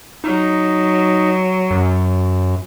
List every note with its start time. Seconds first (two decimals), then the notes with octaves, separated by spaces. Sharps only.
0.24 F#3 D#4
1.71 F#2